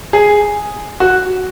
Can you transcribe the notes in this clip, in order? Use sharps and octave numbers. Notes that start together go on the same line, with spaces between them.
G#4
F#4